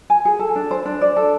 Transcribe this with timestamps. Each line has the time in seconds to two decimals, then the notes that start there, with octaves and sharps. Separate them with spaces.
0.10 G#5
0.25 G#4
0.39 A4
0.56 D4
0.71 C5
0.86 D4
1.01 D5
1.16 A4